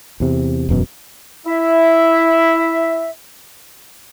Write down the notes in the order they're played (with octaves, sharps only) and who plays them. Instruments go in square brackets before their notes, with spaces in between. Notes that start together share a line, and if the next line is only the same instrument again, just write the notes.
[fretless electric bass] E2 C3
E1 F#2 B2
[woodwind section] E4 E5